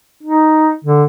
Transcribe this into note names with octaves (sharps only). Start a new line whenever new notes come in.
D#4
D3